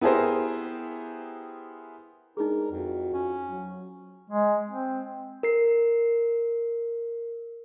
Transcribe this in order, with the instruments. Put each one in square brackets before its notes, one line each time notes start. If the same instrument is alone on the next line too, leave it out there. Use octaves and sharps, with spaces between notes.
[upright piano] B3 E4 G4 G#4 A#4 C5
[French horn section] G#3 B3 D4 [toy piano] D#4 G#4 [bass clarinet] A#4
[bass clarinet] F2 [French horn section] F3 E4 F#4
[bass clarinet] C#4
[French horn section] F#3
[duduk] G#3
C4
[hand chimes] A#4 C7